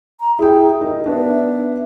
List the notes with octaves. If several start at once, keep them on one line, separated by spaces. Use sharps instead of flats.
A#5
E4 G#4 G5
D#4 A#4
B3 D4 E5